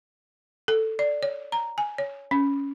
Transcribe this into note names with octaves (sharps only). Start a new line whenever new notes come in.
A4
D5
C#5
A#5
G#5
C#5
C#4